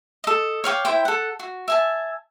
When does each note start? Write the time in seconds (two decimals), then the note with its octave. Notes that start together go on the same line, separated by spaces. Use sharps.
0.24 A4 D#5
0.64 C#5 F5 G5 D6
0.85 E4 C5 G5
1.05 A4 F#5
1.39 F#4
1.68 E5 G#5 A5